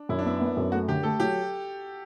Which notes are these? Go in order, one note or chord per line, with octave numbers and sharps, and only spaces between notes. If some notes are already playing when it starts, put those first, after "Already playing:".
Already playing: D4
F#2 E4
D4
B3 E4
B3
F#2
A3 F#4
D3 G4
A3 A4
F#3 G4